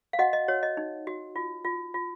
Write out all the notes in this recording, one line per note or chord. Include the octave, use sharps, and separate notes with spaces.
F5
F#4 D#5 F#5
D#5
F#4 C#5
D#5
D#4
F#4
F4
F4
F4